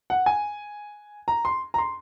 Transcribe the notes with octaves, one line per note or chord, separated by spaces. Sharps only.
F#5
G#5
A#5
C6
A#5
C6